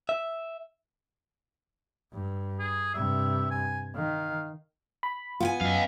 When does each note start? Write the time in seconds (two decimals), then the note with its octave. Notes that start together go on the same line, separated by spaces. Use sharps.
0.09 E5
2.13 G2
2.59 G#4
2.94 G2 C3 E5
3.51 G#5
3.96 D#3 F5
5.03 B5
5.40 B3 F4 G5 G#5
5.61 F#2 D#5 F5